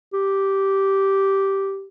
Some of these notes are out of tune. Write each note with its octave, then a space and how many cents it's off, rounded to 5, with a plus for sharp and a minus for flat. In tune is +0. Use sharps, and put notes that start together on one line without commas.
G4 -10